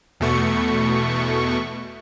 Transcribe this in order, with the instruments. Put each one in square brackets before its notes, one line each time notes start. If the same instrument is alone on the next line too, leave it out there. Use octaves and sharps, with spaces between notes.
[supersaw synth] E2 B2 A3 C#6